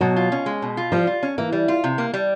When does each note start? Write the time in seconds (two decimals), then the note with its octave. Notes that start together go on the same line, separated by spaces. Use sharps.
0.01 B2 F#3
0.16 F4
0.32 C#4
0.46 G#3
0.62 B2
0.77 F4
0.92 F3 G3
1.07 F4
1.23 C#4
1.38 E3 A#3
1.52 G3
1.68 F4
1.84 C3
1.98 A#3
2.14 G3